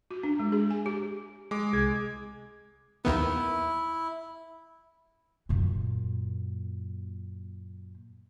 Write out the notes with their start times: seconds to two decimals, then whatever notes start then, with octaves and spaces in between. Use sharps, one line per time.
0.11 F#4
0.23 D4
0.40 G#3
0.52 G#4
0.70 G#5
0.86 G4
1.51 G#3 D6
1.73 C2 G#4 G#6
3.05 D#2 D#3 B3 E4
5.49 F#2 A#2